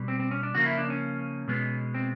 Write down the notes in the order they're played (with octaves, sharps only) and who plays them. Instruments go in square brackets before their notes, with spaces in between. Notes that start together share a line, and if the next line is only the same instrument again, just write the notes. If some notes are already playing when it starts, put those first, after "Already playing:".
Already playing: [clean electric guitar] B2 G3
C4
C4
C#4
D4
C#3 F3 A#3 F#4
E4
D4
C#4
B2 G#3 B3
C4